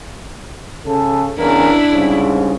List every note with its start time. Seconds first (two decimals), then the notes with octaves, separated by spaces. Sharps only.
0.85 C#3 A4
1.38 E2 C#3 D4 E4 A#4
1.91 C2 G#2 C#3